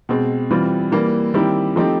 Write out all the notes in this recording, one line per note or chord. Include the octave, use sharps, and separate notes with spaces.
B2 G#3 C4
E3 G3 C4 F4
E3 G3 A#3
D#3 G3 C4 E4 G4
F3 A3 C4 D#4 G4